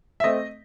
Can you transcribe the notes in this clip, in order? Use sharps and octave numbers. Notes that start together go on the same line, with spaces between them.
E5
A3 C4 D#5